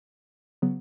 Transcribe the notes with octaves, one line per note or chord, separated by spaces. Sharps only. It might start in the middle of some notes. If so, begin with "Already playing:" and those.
C#3 F#3 B3